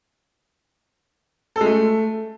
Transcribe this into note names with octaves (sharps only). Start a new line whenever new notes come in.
A4
G#3
A3